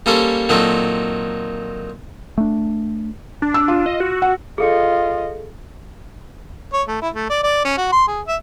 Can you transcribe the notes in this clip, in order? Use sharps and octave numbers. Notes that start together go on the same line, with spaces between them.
G3 A#3 C#4 A4 C5
A#2 D#3 F#3 C4 A4
A3 D4
D4
E6
F4
D#5
F#4
F#5
F4 G#4 A4 D#5 C#7
C#5
A3
E4
A3
D5
D5
C#4
F#4
C6
G#4
E5